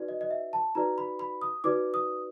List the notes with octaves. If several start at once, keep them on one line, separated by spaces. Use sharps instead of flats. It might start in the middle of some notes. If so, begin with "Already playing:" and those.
Already playing: D#4 F#4 B4 D5
D#5
D#5
E5
A5
D#4 F#4 B4 D5 A#5
B5
B5
D#6
D#4 F#4 B4 D5 D6
D#6